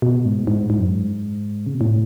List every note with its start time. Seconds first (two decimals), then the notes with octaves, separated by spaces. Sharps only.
0.02 B2
0.25 G#2
0.47 G#2
0.70 G#2
0.80 F#2
0.89 G#2
1.66 C#3
1.74 B2
1.81 A2